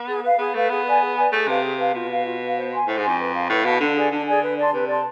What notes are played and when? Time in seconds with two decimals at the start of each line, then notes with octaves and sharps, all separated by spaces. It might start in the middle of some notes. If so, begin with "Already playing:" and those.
Already playing: B3
0.08 G#4
0.24 B4 F5
0.39 B3 G#4
0.55 A3 B4 F5
0.70 B3 G#4
0.85 B4 D5 G#5
1.01 G#4
1.16 B4 D5 G#5
1.32 A3 G#4
1.47 C3 B4 F5 A5
1.64 G#4
1.79 B4 F5 A5
1.94 B2 F4
2.09 B4 F5
2.25 F4
2.41 B4 F5
2.56 C5
2.71 G#5 C6
2.87 A2 C5
2.97 G#2
3.03 F2 G#5 C6
3.19 B4
3.34 F5 A5
3.49 A2 B4
3.65 B2 F5 A5
3.80 D3 D4
3.96 G#4 D5 G#5
4.11 D3 D4
4.27 G#4 D5 G#5
4.42 B4
4.58 D5 A5 C6
4.74 C3 B4
4.89 D5 A5 C6